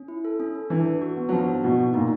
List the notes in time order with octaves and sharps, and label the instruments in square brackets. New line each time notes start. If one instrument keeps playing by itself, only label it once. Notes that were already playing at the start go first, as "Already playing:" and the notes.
Already playing: [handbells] C#4
E4
A4
C#4
A4
[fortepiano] E3 [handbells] D4
[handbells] B4
F#4
B3
[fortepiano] F#3
[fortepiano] F3 [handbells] D4
[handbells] B3
[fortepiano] B2 [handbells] F#4
[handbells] F#4
[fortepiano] A#2 [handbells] D#4